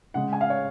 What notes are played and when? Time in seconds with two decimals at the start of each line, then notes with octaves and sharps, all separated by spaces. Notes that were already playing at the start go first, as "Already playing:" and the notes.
0.14 C#3 G#3 F#5
0.33 G#5
0.41 F5
0.50 C#5